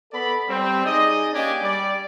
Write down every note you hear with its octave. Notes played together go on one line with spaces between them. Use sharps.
B3 A4 D5 B5
G3 C4
D#4 G#4 D5 D#5
A#3 C#4 D4 G4 D5 G#5
G3 D5